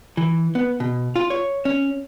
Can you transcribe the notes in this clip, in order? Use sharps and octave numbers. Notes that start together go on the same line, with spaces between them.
E3
B3
B2
F4
C#5
C#4